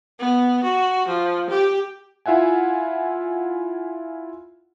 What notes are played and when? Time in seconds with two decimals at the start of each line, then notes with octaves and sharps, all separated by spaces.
0.20 B3
0.63 F#4
1.08 F3
1.50 G4
2.26 E4 F4 E5 F#5 G#5